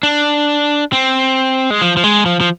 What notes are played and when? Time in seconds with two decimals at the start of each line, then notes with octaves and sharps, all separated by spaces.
0.03 D4
0.93 C4
1.70 G#3
1.82 F3
1.97 F3
2.04 G#3
2.26 F3
2.40 F3